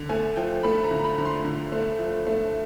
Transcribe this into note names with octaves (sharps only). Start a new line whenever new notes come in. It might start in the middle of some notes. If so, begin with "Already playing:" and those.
Already playing: D3
A3 G#5
F3 G5
A3 B5
A#5
D3
B5
D3
C6
D3
A3
F3
A3